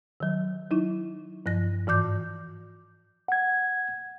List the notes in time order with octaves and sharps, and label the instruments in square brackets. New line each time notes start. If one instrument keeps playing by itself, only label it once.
[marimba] D#3 F#3
F#3 D#4 E4
G2 F3 A#6
G#2 E3 D6 G6
[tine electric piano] F#5 G#6